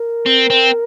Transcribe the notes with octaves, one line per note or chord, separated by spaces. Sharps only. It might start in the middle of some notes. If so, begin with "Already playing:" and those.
Already playing: A#4
C4
C4